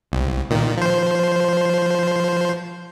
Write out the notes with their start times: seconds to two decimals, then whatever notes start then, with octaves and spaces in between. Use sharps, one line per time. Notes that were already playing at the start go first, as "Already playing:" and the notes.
0.12 C2
0.50 A#2 D#3
0.77 F3 C5